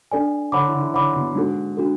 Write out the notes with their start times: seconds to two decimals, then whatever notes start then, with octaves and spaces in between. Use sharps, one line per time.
0.11 D4 A4 D5 G#5
0.52 D3 C#5 F#5 B5 D6
0.67 E3
0.74 D3
0.80 E3
0.94 D3 C#5 F#5 B5 D6
1.15 B2
1.35 G#2 D4 F#4 A4
1.77 D4 F#4 A4